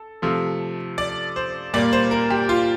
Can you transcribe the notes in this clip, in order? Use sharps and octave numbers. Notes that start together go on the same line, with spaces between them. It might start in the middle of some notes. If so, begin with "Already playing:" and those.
Already playing: A4
C3 F3 A3
D5
C5
A#2 G3 A#3 D5
C5
A#4
G4
F4